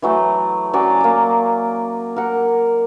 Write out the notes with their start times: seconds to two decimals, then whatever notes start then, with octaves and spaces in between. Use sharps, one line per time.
0.02 E3 F#3 A3
0.73 F#3 C#4 D5 G#5
1.00 A#3 D6
2.16 A#4 F#5